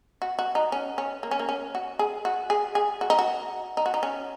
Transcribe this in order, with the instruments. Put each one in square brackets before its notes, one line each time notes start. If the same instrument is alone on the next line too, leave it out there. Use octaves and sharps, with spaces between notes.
[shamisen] F#4
F#4
D#4
C#4
C#4
A#3
C#4
A#3
C#4
F#4
G#4
F#4
G#4
G#4
F#4
D#4
F#4
D#4
F#4
D#4
C#4